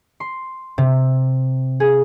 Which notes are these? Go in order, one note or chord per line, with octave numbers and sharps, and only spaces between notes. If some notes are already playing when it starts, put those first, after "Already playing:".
C6
C3
G#4